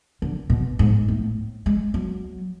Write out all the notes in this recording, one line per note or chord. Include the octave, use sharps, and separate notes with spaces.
D3
B2
G#2
A2
G#3
F#3